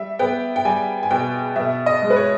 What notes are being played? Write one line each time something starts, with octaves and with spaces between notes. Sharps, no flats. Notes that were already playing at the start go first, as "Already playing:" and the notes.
Already playing: G3 E5
B3 G5
G5
G3 G#5
G#5
B2 G5
B2 E5
D#5
G#3
B4
C#5